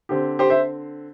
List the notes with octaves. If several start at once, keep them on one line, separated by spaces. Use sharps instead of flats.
D3 C4 G4
G4 C5
C5 E5